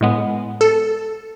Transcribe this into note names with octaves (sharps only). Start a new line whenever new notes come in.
A2 G#3 B3
A4